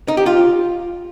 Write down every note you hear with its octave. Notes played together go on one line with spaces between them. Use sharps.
D#4
G4
F4